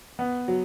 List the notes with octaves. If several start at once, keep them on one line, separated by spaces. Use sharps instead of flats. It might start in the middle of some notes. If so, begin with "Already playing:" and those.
B3
F#3